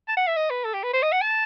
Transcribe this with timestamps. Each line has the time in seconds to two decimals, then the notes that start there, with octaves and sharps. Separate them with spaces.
0.08 A5
0.17 F#5
0.27 E5
0.36 D#5
0.50 B4
0.65 A4
0.74 G4
0.84 B4
0.93 C5
1.03 D#5
1.12 F#5
1.22 A5